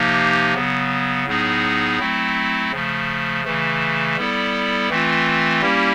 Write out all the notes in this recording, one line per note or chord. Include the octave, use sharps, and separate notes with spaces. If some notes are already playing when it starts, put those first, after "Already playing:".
Already playing: C3 F3 A#3 D#4 G4
C#3 F#3 B3
A2 F#3 B3 D#4 G#4
F#3 A3 C4 E4
C#3 F3 A3
C#3 E3 A3
G3 B3 E4 A4 D5
E3 A3 C4 F4
G3 A#3 C#4 E4 G4